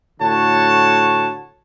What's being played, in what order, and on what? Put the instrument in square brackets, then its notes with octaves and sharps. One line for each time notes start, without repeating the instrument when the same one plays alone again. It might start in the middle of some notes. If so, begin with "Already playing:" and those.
[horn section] A2 D3 F#4 C#5 A5